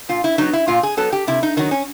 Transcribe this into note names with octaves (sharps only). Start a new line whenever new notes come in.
A#2 F4
E4
F#3 B3 D#4
E4
A#2 F4
G#4
F#3 B3 A4
G4
C3 E4
D#4
D#3 F#3 D#4
C#4